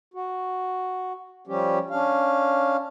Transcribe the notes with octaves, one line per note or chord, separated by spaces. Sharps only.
F#4
F3 G3 C#4 G4
C#4 D4 F5